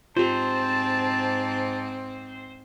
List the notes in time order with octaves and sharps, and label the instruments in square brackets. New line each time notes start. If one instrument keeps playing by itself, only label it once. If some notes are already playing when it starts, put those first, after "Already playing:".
[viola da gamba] G#2 C4 [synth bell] F4 G4 [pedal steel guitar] C5 [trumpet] A5